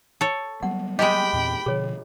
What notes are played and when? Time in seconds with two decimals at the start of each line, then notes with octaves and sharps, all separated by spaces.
0.21 A4 C#5
0.63 F#3 G3 B3 F#5
0.99 G#3 G4 D#5 G5 B5
1.33 E2 A#2 C4
1.66 B2 D3 F3 G#4 C#5